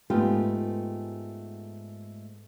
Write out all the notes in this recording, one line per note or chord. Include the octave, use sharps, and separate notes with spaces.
G#2 A3 B3 F4 G4